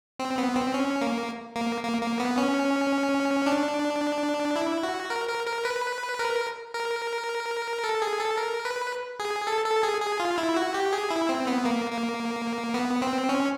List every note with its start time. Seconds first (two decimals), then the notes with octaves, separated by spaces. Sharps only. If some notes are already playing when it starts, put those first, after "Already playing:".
0.19 C4
0.38 B3
0.56 C4
0.74 C#4
1.01 A#3
1.56 A#3
1.83 A#3
2.02 A#3
2.20 B3
2.38 C#4
3.46 D4
4.56 E4
4.83 F#4
5.10 A#4
5.29 A#4
5.47 A#4
5.65 B4
6.19 A#4
6.74 A#4
7.84 A4
8.02 G#4
8.20 A4
8.38 A#4
8.65 B4
9.19 G#4
9.47 A4
9.65 A4
9.83 G#4
10.01 G#4
10.20 F4
10.38 E4
10.56 F#4
10.74 G4
10.93 G#4
11.11 E4
11.29 C4
11.47 B3
11.65 A#3
11.92 A#3
12.74 B3
13.02 C4
13.29 C#4